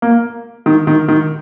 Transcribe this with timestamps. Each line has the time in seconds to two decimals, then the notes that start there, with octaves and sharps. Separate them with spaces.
0.02 A#3
0.66 D#3
0.87 D#3
1.08 D#3